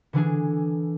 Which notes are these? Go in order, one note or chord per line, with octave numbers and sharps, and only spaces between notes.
D3 E3 D4 G#4